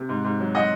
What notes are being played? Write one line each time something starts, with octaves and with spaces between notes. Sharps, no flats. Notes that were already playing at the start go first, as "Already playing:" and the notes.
Already playing: C3
G#2
G#2
F#3
F#3 D#5 F#5